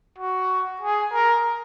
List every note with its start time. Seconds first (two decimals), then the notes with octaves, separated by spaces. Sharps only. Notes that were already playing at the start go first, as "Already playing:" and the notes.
0.18 F#4
0.82 G#4
1.13 A#4